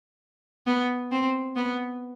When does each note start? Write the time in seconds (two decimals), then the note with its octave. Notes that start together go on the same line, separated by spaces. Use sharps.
0.66 B3
1.11 C4
1.56 B3